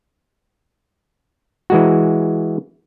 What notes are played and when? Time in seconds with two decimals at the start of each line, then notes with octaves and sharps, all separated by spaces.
1.70 E3 G#3 F#4